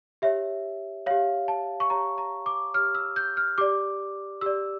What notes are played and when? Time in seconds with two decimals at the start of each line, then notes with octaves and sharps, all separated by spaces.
0.22 G4 C#5 E5
1.06 G4 C#5 F5
1.48 A5
1.80 C#6
1.90 G4 C#5 A#5
2.18 A#5
2.46 D6
2.74 G4 C#5 F6
2.95 E6
3.16 G6
3.37 F6
3.58 G4 D5 D6
4.41 G4 D5 E6